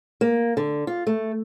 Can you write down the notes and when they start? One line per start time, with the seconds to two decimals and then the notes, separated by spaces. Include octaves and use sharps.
0.21 A#3
0.57 D3
0.87 F4
1.07 A3